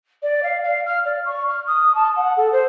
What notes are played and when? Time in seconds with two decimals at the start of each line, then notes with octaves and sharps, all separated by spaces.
0.22 D5
0.43 F5
0.63 F5
0.85 F6
1.05 D5
1.25 C#6
1.48 F6
1.67 D#6
1.94 A5
2.16 F#5
2.36 A4
2.52 C5